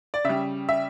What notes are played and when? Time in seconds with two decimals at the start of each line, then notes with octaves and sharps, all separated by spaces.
0.14 D5
0.24 C#3 G3 E5
0.69 E5